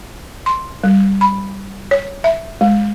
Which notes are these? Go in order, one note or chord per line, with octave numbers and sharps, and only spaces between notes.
C6
G3
B5
C#5
E5
G#3